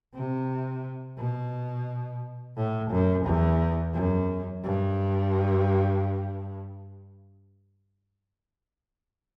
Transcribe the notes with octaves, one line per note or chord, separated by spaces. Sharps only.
C3
B2
A2
F#2
E2
F#2
G2